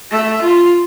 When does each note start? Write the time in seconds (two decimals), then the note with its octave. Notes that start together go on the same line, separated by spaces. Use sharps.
0.11 A3 E5
0.42 F4